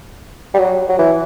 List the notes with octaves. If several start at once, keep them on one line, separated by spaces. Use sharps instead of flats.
G3
F#3
F#3
E3